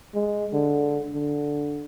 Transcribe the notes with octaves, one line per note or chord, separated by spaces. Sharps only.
G#3
D3
D3